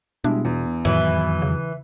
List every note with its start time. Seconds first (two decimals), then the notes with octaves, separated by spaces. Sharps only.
0.24 B2 G3 G#3 D4 E4
0.45 E2
0.85 F2 A2 D#3 E3 F#3
1.42 C#3